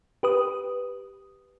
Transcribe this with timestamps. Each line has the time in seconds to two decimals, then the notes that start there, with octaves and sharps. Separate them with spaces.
0.23 G4 B4 D#6